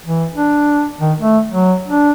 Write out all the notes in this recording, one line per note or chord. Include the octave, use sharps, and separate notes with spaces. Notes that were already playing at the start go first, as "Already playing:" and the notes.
E3
D4
D#3
A3
F#3
D4